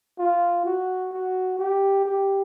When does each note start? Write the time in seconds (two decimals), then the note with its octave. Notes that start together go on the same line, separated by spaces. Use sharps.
0.19 F4
0.65 F#4
1.12 F#4
1.59 G4
2.05 G4